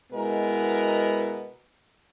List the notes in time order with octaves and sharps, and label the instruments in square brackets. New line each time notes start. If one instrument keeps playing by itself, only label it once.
[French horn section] B2 G#3 B3 E4 A#4